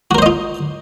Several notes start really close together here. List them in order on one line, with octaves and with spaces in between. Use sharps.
F#4 A#4 C5 D#5 F4